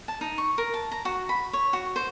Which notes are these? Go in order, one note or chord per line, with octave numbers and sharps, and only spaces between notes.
A5
D#4
C#6
A#4
A5
A#5
F#4
B5
C#5
F#4
C5